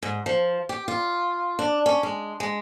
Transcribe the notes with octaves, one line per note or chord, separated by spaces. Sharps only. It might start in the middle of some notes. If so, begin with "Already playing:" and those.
G#2
F3
G4
F4
D4
C#4
G#3
G#3